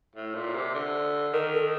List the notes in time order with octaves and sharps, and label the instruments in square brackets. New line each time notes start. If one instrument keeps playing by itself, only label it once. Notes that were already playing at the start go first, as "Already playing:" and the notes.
[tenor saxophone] A2
A#2
C3
D3
[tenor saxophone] D#3 [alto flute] A#4
[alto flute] A4